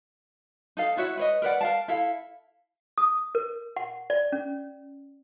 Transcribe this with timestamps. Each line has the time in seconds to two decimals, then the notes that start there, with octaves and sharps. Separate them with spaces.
0.77 D#4 A4 F5
0.97 E4 F#4 C#5 E5
1.17 B4 C#5 D#5
1.42 A#4 B4 D5 F#5
1.61 A#4 F5 A5
1.88 E4 A4 F5
2.98 D#6
3.35 A#4
3.77 F#5
4.10 D5
4.32 C#4